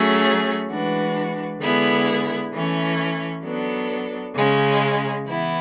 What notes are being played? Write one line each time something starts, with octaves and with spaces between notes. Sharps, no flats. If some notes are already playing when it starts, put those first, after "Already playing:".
Already playing: F#3 A3 C#4 G#4
E3 G#3 D4 F#4 B4
D3 G#3 B3 E4 G#4
E3 A3 C#4
F#3 B3 D4 A4
C#3 G#3 C#4
E3 B3 E4